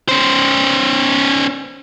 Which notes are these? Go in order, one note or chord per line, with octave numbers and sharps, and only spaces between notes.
C#4 C5